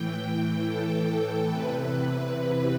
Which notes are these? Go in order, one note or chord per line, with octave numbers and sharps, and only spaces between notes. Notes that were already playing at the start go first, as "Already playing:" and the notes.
Already playing: A2 E3 G5
A4
E2 C3 E3 B4